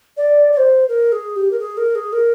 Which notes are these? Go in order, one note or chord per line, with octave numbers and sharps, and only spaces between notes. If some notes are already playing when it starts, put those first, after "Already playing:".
D5
D5
C5
A#4
G#4
G4
A#4
G#4
A#4
G#4
A#4